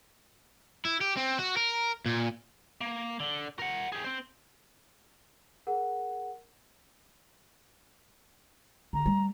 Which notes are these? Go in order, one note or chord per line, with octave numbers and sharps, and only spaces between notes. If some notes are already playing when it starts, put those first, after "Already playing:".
E4
G4
C4
F#4
A#4
A#2
A#3
D3
A#4 F#5
G4 G#4
C4 C5
G#4 A#4 F#5
D3 A#5
G3 A3